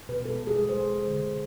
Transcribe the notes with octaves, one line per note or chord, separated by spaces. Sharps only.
B2 B4
G#3 A4
B2
G#4
G#3
G#3 C5
G#3
D3
D3